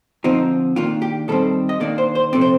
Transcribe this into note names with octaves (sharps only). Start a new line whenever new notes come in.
D3 F3 C4 D#4
D#3 A#3 D4 F4
G4
D#3 G3 C4 A4
D#5
D#3 A#3 D4 D5
C5
C5
C3 F3 A3 C4 D5
C5